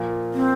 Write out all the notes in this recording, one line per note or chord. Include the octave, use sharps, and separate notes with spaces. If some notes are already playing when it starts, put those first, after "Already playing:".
Already playing: A#2 F3 A#3 F4
C4